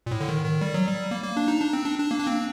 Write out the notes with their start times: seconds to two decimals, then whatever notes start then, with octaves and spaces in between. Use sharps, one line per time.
0.06 A#2
0.11 A2
0.21 D3
0.29 D#3
0.45 D#3
0.61 G3
0.74 F#3
0.87 G3
1.11 A#3
1.23 A#3
1.37 D4
1.48 D#4
1.61 D4
1.73 C4
1.86 D4
1.98 D4
2.11 A#3
2.20 D4
2.27 C4